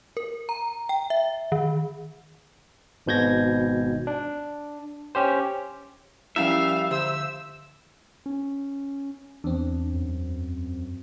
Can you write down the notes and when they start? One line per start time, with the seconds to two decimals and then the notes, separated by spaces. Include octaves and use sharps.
0.17 A#4
0.49 A#5
0.89 G5
1.10 E5
1.52 D#3
3.06 G#1 G#2 B2 G6 G#6 A#6
4.07 D4
5.15 C#4 G4 C5
6.36 F3 G3 C#4 E4 E5 F5
6.91 D3 C5 E6
8.26 C#4
9.44 E2 C4 D4
9.94 F#2